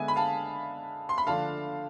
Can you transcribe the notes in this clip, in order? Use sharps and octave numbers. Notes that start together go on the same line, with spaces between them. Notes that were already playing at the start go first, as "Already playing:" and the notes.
Already playing: D3 G#3 B3 D4 E5 G#5
B5
F5 A5
C6
B5
D3 F3 A3 D4 F5 A5